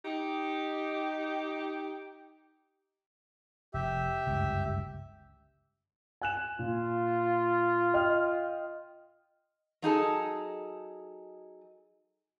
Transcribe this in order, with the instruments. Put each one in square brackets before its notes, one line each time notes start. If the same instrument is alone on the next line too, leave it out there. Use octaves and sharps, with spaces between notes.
[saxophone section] D#4 G4
[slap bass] F1 [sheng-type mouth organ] G4 E5
[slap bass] G1 C#2 F#2
[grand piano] G#5 F#6 E7
[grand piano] A#2 [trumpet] F4
[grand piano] D#5 G5 F6
[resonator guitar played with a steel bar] F#3 D#4 G#4 A4